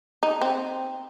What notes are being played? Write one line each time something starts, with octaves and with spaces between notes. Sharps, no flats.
D#4
C4